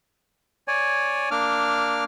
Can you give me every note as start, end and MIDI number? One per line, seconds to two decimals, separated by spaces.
0.68 1.29 73
0.68 1.29 74
0.68 1.29 80
1.31 2.04 58
1.31 2.04 62
1.31 2.04 86
1.31 2.04 89